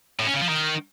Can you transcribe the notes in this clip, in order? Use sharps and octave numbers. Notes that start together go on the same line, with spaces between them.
A2
C#4
C#3
F3
D#3